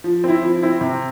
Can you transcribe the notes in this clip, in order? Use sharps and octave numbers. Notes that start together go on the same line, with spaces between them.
F3
C4 E4
F3
C4 E4
C3